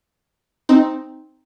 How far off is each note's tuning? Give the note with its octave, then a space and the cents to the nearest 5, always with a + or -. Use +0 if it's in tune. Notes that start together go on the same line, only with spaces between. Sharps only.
C4 +0 D#4 +0 C5 -5